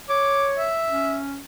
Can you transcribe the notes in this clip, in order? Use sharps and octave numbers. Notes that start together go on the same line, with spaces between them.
C#5 D6
E5
C#4